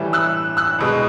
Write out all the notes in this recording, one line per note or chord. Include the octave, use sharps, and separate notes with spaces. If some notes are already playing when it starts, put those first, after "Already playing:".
Already playing: A2 E3 G3
E6 F#6
E6 F#6
C2 B2 G#3